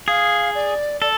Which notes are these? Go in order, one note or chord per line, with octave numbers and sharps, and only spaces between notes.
G#4 F5
D5
A4 D5